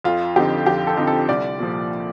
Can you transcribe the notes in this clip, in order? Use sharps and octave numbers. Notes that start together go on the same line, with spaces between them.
F2 F4
D3 F3 C4 D#4 G4
F2 G4
A4
D3 F3 C4 D#4
A4
C2 D5
A#2 F3